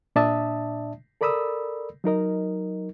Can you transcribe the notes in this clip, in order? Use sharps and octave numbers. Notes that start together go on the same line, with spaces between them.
A#2 D4 D5 E5 A5 D#6
A4 A#4 D5 B5 D#6 E6
F#3 D#4 A#4 D#5